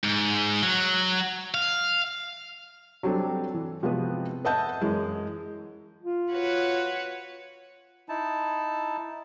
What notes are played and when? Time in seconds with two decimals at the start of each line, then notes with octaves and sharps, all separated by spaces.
0.04 G#2
0.63 F#3
1.54 F5
3.03 F#3 G3 C4 D4 A4 C#5
3.54 E3
3.83 C3 F3 G#3 B3 F#4 B4
4.45 B4 D#5 E5 F#5 A5 G6
4.81 F#2 E3 G#3
6.02 F4
6.32 F#4 B4 C#5
8.09 D#4 E4 A5